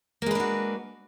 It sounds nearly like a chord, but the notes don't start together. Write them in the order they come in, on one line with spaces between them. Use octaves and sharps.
A#3 G#3 B4 D4 F#4